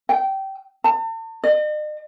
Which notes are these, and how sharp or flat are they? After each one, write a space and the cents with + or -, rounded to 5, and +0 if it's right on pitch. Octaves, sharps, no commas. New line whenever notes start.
G5 -20
A5 +40
D#5 -45